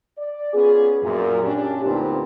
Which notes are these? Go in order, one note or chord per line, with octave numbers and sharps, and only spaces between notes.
D5
B3 C#4 F4 G#4
F#2 A#2
C#4 D4 G4
D2 A#2 B3 C4 D#4 G4